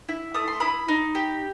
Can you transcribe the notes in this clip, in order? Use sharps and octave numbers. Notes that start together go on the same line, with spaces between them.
E4
A3 D#6
C6
E4 B5 D#6
D#4
G4